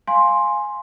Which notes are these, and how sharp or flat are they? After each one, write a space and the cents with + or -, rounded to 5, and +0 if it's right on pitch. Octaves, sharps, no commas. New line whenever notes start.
F5 +0 G#5 +0 C6 +5